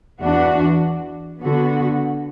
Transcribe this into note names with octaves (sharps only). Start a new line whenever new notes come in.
E2 E3 D4 F#4
D3 B3 F#4